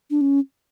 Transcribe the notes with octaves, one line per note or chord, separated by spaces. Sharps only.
D4
C#4